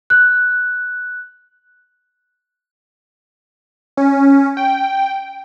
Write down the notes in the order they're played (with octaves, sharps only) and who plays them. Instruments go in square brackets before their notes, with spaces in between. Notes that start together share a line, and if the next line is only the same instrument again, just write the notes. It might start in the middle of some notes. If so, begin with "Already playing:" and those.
[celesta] F#6
[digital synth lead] C#4
G5